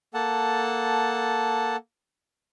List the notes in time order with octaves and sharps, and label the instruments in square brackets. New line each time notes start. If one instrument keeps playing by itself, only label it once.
[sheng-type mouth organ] A#3 A4 F#5 A5